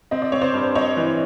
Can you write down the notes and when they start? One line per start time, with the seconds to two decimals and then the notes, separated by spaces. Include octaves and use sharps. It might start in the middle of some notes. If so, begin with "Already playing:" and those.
0.11 C4 D#5
0.22 D5
0.32 C4 C#5
0.42 C5 D5
0.54 G2
0.75 C4 C#5 D#5
0.97 E3